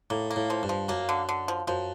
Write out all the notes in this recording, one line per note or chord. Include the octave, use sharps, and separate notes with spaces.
A2 A#3
A#3
A2
F3
G2
F3
F#2 A#3
D3
D3
F3
F#2 F3